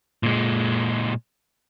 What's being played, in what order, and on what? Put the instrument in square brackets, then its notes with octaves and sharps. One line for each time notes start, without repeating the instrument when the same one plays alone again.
[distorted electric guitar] A#2 G#3